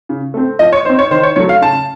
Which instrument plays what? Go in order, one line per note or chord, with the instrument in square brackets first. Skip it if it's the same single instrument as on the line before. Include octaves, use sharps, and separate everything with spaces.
[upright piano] C#3
A3 C4
F3 D#5
C#5
C4 D#4 C5
C#5
D#3 C5
C#5
F#3 A3 C#5
F5
C#3 A5